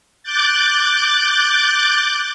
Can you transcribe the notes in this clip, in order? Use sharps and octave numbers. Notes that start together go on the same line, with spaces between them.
D6 F#6 G6 A6